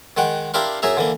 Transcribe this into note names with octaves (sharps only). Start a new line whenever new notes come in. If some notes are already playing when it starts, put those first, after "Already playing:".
D#3 G#3 F#5 G5
D4 E4 G4 A#4 F5 C6
F#2 G#4 E5 A#5
D3 E3 A#3